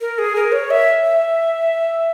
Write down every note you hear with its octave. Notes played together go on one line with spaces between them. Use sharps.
A#4
G#4
A#4
C#5
E5
E5